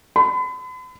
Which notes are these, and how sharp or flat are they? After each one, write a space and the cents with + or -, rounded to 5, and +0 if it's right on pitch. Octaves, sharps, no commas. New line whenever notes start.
B5 +40